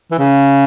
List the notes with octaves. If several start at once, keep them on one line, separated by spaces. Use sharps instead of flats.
E3
C#3